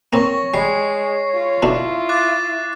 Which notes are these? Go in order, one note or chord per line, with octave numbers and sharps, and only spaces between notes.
A#3 C4 C#5 C#6 A#6
G3 G#3 C#5 C7
F4
B2 D3 D4 E4
D6 F#6 A6